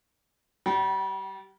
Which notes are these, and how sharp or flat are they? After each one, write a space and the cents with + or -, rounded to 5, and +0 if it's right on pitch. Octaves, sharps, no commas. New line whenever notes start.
G3 -25 G5 -45